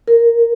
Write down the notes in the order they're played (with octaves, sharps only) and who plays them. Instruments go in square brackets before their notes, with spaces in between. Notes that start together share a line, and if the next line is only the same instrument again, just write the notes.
[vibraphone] A#4